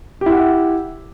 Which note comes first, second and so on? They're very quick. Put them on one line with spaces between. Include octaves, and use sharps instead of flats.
G4 E4 F#5